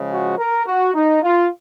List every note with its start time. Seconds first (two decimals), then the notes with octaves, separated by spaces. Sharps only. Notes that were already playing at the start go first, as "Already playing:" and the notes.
Already playing: C#3 F3 G#3
0.10 F#4
0.38 A#4
0.66 F#4
0.94 D#4
1.22 F4